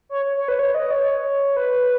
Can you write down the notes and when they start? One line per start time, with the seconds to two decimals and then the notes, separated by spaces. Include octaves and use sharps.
0.09 C#5
0.26 C#5
0.37 C#5
0.48 B4
0.59 C#5
0.75 D#5
0.91 C#5
1.57 B4